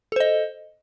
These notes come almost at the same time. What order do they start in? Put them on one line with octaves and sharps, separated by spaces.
A4 C5 D#5